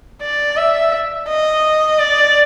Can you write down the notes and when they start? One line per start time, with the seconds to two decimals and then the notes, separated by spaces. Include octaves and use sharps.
0.22 D5
0.57 E5
1.28 D#5
1.99 D5